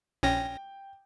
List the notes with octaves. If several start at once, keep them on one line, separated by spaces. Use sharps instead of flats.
A#1 C#4 G5 A#6